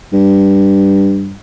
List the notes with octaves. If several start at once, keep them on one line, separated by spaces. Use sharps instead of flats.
G2